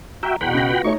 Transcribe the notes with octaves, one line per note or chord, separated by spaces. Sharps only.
F#4 E5 G5 A#5
E2 B2 F#5 G5 B5
C#3 A#6
B3 F4 F#4
A3 D#4 C#5 C#6